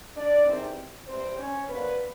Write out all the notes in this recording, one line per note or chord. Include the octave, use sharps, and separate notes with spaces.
D4 D5
E2 C3 D#3 G3 C4
C3 E3 G3 C4 C5
C#4 C#5
C3 F3 A#3 B3 D4 B4